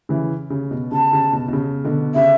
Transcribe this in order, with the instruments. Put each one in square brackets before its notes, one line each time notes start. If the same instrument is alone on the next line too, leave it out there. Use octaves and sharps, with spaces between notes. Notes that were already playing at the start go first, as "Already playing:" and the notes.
[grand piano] C#3 E3
C#3
B2
[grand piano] C#3 [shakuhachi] A5
[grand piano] C#3
B2
B2
C#3
B2 D3
[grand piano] C#3 [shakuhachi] E5